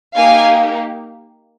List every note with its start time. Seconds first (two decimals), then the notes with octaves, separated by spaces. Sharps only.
0.16 A#3 D#4 G4 F5 G#5